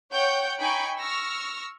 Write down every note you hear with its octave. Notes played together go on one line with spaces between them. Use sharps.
C#5 F#5 G5 C#6 G6
D#4 G5 G#5 B5 C#6 D7
C#6 E6 F6 A#6